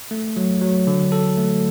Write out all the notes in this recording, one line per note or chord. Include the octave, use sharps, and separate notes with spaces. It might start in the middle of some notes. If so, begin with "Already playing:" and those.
A3
F#3
F#3
D3
A4
A3